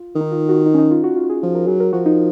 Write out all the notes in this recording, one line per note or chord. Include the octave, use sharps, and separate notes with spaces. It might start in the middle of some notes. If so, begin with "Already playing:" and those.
Already playing: F4
D#3
D#4
F4
F#4
D#4
C#4
D#4
F4
F#4
F4
F#4
G#4
F3
A#4
F#3 G#4
A#4
F3 F#4
D#4